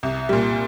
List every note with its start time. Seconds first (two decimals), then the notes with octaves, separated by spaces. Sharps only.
0.03 C2
0.29 A#2 G3